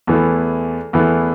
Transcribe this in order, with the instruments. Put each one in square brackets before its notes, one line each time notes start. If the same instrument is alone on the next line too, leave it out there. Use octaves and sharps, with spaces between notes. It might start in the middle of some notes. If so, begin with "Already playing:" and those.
[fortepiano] E2 E3 A3
E2 E3 A3